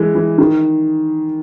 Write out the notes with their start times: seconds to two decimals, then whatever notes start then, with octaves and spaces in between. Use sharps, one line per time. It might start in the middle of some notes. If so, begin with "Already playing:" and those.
Already playing: E3 G#3
0.15 E3
0.38 D#3